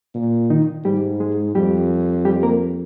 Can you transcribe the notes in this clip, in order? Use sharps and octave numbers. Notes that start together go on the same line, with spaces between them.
A#2
D#3 D#4
G#2 G3 G4
G#3 G#4
F2 G3 G4
G3 G4
A#3 A#4